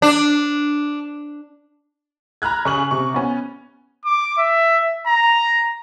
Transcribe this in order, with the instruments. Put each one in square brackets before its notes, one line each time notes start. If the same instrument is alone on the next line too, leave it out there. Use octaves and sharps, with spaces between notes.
[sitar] D4
[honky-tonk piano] A#5 B5 F6 F#6 G#6
C#3 C#6 F#7
C3 C#6
B3 C#4
[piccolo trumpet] D6
E5
A#5